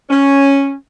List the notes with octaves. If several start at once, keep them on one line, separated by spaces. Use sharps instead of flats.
C#4